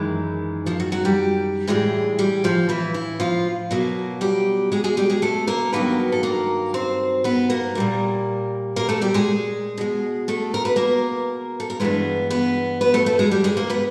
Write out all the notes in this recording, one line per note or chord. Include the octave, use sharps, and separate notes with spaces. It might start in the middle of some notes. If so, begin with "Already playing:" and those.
Already playing: F#2 D#3 E3 G#3 E4
F3 F4
F#3 F#4
F#3 F#4
G3 G4
A2 E3 G3 G#3 G#4
G3 G4
F3 F4
E3 E4
E3 E4
F3 F4
B2 F#3 A#3
G3 G4
G#3 G#4
G#3 G#4
G3 G4
G#3 G#4
A3 A4
A#3 A#4
G2 D#3 F#3 A#3 B3 B4
A4
A#3 A#4
C4 C5
B3 B4
A#3 A#4
A#2 G3 A#3
A#3 A#4
A3 A4
G3 G4
G#3 G#4
B2 G#3
A3 A4
A#4
B4
A#3 A#4
A4
A#4
G2 E3 G#3 B3 B4
B3 B4
B3 B4
A3 A4
A3 A4
G#3 G#4
G3 G4
G#3 G#4
A#3 A#4
B3 B4